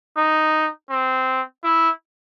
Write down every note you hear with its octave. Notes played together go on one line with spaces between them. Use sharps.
D#4
C4
E4